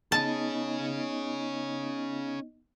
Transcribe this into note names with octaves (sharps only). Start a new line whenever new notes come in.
B3 C#4 D#4 G#4 D#5 A5